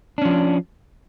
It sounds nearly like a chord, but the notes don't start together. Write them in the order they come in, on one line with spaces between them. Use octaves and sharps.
D4 C#4 F3